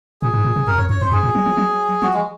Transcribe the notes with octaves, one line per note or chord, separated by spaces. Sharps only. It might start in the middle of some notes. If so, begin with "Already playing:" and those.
A#2 G#4
G#2
A#2
C3
F2 A#4
F2 C#5
F#2 C#5
F2 C5
F#2 G#4
A#2
F#3
F3
F#3
F3 F#4
G#3